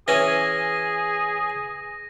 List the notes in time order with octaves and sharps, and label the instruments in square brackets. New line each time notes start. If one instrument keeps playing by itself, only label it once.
[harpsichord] E3 C#4 G#5 [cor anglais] G#4 [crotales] A#6 D#7